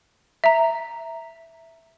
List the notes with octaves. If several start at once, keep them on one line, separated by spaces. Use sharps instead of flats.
E5 A#5